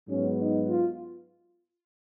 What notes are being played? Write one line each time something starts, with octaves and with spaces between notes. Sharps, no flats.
G#2 F#3 B3 C#4
D#4
F4